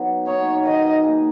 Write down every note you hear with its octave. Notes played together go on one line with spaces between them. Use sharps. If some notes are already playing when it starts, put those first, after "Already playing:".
Already playing: F#3 B3 D#4
B3 D#4 C#5
D#3 D#5
A#3 D#4 G#4